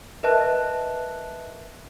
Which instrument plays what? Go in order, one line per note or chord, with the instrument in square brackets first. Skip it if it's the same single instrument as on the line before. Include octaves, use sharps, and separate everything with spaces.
[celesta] A#4 B4 D#5 E5 A5 F#6